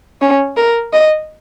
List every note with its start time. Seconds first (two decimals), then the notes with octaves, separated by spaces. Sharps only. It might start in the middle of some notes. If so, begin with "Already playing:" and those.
0.21 C#4
0.57 A#4
0.93 D#5